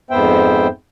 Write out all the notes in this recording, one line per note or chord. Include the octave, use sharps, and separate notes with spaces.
F2 G#2 B3 C5 E5 G5